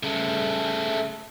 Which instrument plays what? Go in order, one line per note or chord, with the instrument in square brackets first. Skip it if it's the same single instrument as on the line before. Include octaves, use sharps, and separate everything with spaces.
[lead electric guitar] C#3 A3